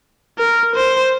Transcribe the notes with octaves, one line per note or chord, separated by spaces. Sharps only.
A#4
C5